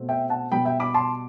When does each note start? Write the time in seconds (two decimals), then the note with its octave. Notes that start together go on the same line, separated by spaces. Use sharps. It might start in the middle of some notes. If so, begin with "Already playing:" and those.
Already playing: B2 A3 C4
0.09 E5 G5
0.29 F#5 A5
0.51 B2 G3 B3 G5 B5
0.65 E5 G5
0.80 B5 D6
0.94 A5 C6